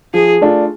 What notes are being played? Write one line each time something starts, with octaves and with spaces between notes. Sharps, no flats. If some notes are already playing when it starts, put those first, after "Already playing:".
F3 G#4
A3 D4 F4